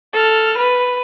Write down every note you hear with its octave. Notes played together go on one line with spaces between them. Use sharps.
A4 F6
B4